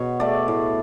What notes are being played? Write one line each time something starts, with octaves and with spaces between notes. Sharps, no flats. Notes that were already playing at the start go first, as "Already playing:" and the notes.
Already playing: B2 C#5
A3 D5
A2